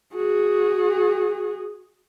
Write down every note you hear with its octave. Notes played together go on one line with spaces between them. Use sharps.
F#4 G#4